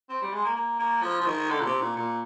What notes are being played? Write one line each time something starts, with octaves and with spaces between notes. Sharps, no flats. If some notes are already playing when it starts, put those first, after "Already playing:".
C4
G3
G#3
A#3
A#3
A#3
F3
F3
D#3
D3
A#2
C3
A#2
A#2